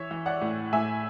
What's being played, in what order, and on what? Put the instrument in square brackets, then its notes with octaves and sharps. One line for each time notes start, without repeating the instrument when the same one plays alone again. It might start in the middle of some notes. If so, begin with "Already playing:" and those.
Already playing: [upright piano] E3 C#5 E5
E3
D5 F#5
A2
A2 E5 G#5